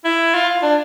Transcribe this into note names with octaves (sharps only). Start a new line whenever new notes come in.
E4
F4
D4